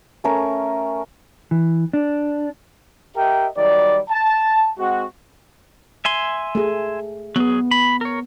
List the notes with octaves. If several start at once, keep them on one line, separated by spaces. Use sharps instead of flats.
A3 C#4 A#4
E3
D4
G4 A#4 D#5 E5 G5
D#3 F#3 G3 D5
A5
G#3 C4 F#4
E5 G#5 C6
A3 G#4
F#3 B3 G#4
B5
A#4 C#5